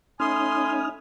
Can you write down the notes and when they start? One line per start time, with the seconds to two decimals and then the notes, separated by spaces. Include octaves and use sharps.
0.20 A3 C#4 D#4 G#5 B5 C6 D#6 F6